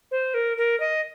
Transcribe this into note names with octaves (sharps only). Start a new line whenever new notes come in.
C5
A#4
A#4
D#5